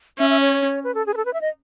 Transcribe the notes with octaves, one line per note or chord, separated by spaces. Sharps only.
C#4 E5
E5
C#5
B4
A4
G#4
B4
A4
B4
E5
D#5